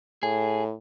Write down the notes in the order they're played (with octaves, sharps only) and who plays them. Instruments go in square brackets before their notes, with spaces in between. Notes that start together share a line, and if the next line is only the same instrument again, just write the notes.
[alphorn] A2 [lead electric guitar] G#4